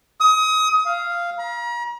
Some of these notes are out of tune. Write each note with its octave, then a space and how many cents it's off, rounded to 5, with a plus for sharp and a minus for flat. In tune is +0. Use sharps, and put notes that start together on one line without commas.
D#6 +30
F5 -10
A#5 +40